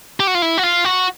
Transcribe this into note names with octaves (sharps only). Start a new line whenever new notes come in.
G4
F#4
F4
E4
F#4
F4
F#4